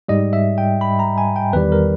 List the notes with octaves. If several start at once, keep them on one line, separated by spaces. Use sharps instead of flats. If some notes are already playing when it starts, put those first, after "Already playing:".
G#2 G3 D#5
E5
G5
B5
A#5
G#5
G5
E2 D#3 G3 B4
A#4